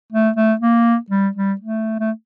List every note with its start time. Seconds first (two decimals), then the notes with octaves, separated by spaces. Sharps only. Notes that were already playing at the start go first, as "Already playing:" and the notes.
0.13 A3
0.36 A3
0.61 A#3
1.11 G3
1.36 G3
1.61 A3
2.00 A3